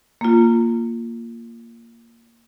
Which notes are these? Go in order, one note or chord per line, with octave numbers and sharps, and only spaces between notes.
A#3 F4